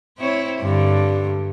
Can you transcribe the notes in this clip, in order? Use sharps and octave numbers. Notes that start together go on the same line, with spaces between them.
C4 E4 C#5
G2 D3 G3